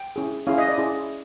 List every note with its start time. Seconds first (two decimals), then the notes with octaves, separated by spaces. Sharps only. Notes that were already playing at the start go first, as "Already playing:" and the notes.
Already playing: G5
0.16 C#4 E4 G#4
0.47 C#4 E4 G#4 F5
0.58 D#5
0.68 D5
0.78 C#4 E4 G#4